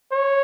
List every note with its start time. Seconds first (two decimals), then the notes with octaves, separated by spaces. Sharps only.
0.12 C#5